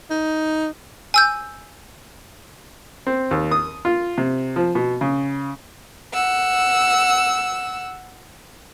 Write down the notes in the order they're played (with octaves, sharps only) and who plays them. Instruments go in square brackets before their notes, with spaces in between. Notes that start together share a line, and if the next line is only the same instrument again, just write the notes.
[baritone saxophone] D#4
[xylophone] G#5 E6 G6
[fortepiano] C4
D#2
D#6
F4
C3
F3
B2
C#3
[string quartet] F#5 E6